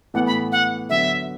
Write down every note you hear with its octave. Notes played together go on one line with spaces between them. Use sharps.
A2 E3 B3 F#5
B5
F#5
D3 F#3 B3 E5